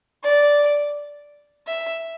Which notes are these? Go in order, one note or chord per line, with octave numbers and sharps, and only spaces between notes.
D5
E5